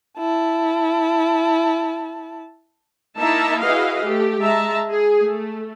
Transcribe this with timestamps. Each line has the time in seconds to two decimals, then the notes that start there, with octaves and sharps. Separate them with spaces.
0.18 E4 A5
3.17 A#3 D#4 E4 E5 A5 A#5
3.61 E4 F#4 G#4 B4 D#5 F5
4.04 A3 G4
4.40 G#3 E5 A5 A#5
4.90 G#4
5.21 A3